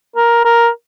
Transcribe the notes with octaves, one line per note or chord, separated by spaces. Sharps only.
A#4
A#4